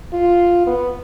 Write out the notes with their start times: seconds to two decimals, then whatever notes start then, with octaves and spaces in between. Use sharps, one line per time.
0.13 F4
0.67 B3